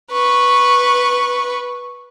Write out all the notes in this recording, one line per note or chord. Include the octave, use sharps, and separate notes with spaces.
B4 C#6